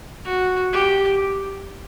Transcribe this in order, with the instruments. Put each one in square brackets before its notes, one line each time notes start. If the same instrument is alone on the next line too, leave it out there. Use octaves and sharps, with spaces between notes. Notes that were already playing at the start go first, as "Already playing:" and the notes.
[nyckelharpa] F#4
G4